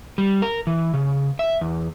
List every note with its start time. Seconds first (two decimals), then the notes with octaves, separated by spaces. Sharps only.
0.18 G3
0.42 A#4
0.67 E3
0.94 C#3
1.39 E5
1.61 E2